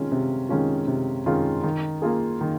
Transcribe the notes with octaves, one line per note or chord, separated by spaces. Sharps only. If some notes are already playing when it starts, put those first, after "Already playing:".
Already playing: C3 D#3 G#3 C#4 F4
C3
D#3 G#3 C#4 F4
C3
D#3 G#3 C#4 F4
D#3
A#3 F4 G#4
D#3